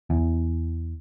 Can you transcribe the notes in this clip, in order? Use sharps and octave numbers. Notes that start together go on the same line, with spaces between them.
E2